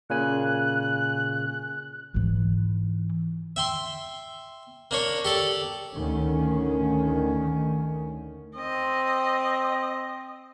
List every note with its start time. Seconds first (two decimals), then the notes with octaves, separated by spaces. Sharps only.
0.10 A#2 C#3 G#5 F#6
2.14 G#2 E3
3.56 E5 G5 C6
4.91 A#3 D4 C#5
5.25 G4 A4 D5
5.95 D2 D#3 C#4
8.56 C4 D#5